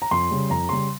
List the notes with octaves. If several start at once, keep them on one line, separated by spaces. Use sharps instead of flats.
A#5
F2 C6
C#3 G3
F2 A#5
C#3 G3 C6